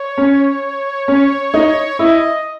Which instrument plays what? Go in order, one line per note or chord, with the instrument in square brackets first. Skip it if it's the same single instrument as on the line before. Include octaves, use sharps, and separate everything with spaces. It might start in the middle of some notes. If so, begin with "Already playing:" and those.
Already playing: [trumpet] C#5
[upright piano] C#4
C#4
D#4
[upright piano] E4 [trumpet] D#5